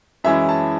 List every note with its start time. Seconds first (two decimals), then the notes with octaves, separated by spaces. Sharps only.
0.24 F#2 E3 G#3 C#4 E4 E5
0.49 A5